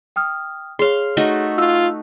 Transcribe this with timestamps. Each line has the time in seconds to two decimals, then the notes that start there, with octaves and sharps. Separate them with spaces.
0.16 G5 D#6 F6
0.79 G#4 C#5 F5 C6
1.17 A3 D#4 F#4
1.58 F4 E6